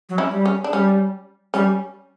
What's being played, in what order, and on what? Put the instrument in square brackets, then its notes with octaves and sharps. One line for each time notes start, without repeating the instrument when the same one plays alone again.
[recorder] F#3
[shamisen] C#4 E4
[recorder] G3
[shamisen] C#4
D4
[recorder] G3 [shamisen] C#4
[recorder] G3 [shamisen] C#4